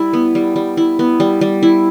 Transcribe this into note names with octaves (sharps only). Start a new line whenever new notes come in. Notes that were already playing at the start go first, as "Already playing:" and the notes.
Already playing: G3 E4
B3
G3
G3
E4
B3
G3
G3
E4